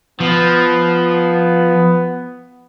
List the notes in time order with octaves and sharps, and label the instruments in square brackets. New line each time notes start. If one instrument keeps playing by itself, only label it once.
[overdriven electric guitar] F3 [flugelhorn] B3